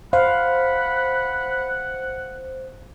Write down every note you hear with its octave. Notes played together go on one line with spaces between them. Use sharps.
C5 F5 F#5 B5